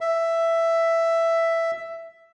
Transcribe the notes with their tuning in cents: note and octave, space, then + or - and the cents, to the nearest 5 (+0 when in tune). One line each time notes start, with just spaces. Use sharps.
E5 +10